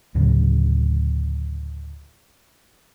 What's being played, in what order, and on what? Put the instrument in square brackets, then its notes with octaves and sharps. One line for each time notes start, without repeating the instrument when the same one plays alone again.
[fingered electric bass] D2 A2 C#3 F#3